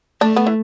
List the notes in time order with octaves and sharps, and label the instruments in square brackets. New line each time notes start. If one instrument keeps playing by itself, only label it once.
[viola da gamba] A3 [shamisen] D4
[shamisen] B3
E3